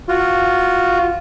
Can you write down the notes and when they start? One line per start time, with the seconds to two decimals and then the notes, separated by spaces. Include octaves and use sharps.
0.08 F4 F#4